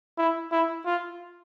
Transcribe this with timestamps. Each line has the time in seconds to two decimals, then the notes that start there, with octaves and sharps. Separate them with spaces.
0.18 E4
0.52 E4
0.86 F4